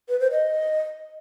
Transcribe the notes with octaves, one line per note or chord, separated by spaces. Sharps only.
B4
C5
D#5